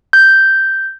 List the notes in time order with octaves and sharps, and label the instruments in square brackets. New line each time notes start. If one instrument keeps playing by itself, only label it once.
[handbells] G6